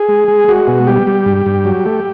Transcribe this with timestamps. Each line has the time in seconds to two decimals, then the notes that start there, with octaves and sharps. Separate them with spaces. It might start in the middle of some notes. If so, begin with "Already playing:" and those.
Already playing: G#4
0.09 G#3
0.28 G#3
0.48 G#3 F#4
0.67 B2
0.87 G3 G4
1.07 G3
1.26 G2
1.46 G2
1.65 F#3
1.86 A3